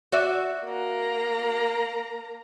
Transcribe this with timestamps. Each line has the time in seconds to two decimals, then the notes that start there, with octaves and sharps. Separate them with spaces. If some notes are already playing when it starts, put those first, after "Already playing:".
0.12 F#4 D5 E5
0.66 A#3 A#5